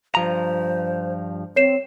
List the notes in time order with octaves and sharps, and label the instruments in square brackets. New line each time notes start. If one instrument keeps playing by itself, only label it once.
[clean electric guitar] G2 F3 A#5 [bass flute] C5
[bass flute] C4 [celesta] C#5 C7 E7